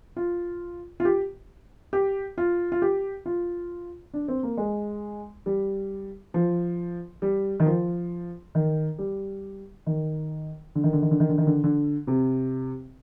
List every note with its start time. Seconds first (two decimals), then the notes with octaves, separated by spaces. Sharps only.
0.17 F4
1.00 F4
1.05 G4
1.93 G4
2.38 F4
2.72 F4
2.82 G4
3.26 F4
4.14 D4
4.28 C4
4.43 A#3
4.57 G#3
5.46 G3
6.34 F3
7.22 G3
7.60 D#3
7.66 F3
8.55 D#3
8.98 G3
9.86 D#3
10.75 D3
10.84 D#3
10.93 D3
11.02 D#3
11.11 D3
11.20 D#3
11.29 D3
11.38 D#3
11.47 D3
11.64 D3
12.07 C3